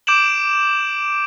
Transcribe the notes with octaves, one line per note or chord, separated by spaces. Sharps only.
D6 G6 D7 E7 F#7